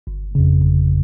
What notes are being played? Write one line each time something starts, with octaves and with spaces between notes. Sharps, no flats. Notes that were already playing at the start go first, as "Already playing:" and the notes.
G1
F2 C#3
G1